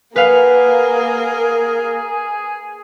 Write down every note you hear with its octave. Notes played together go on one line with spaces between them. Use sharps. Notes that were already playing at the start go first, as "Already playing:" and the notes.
A#3 G#4 A#4 B4 F5 F#5